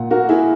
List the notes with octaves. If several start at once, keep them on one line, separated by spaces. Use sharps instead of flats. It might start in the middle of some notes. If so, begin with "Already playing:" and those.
Already playing: A#2 F#5
A#3 F#4 A#4
E4 G#4